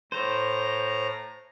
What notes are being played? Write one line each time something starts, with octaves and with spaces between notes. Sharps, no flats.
A2 C5 A#5